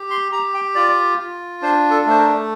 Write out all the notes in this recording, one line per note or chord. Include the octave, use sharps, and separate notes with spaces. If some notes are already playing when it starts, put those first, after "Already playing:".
Already playing: G4
C6
G4 A#5
G5
F4 D5
F4
D4 C5
A4
A3 C5
A#4